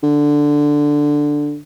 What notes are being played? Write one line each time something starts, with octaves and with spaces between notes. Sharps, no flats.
D3